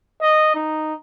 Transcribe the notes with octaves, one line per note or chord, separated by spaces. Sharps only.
D#5
D#4